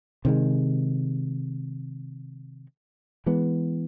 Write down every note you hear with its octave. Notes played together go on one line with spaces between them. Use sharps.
C3 D#3 G#3
E3 G#3 B3